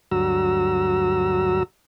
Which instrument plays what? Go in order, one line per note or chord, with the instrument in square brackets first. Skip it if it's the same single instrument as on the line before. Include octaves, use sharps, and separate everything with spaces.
[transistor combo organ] D2 G2 F#3 F#4 A#5 E6